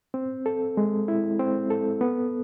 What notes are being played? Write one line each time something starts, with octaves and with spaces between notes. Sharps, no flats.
C4
A4
G#3
E4
C4
A4
B3